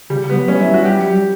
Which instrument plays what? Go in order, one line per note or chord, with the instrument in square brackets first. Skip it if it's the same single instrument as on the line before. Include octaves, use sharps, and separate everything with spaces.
[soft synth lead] C#3 [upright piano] G3
[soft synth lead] G3 [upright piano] B3
[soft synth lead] F#3
[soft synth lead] A3 [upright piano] C#4
[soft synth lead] G3
[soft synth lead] F#3 [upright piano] E4
[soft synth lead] G3
[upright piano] F#4
G4
[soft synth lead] F#3
G3